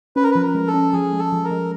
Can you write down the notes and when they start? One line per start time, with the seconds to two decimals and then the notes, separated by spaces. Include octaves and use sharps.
0.16 C#4 B4
0.23 A#4
0.31 F3 B4
0.42 A#4
0.55 G#3
0.67 A4
0.74 C#4
0.93 F3 G#4
1.13 G#3
1.19 A4
1.32 F3
1.44 A#4
1.51 G#3